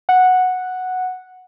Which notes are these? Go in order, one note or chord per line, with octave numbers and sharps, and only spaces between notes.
F#5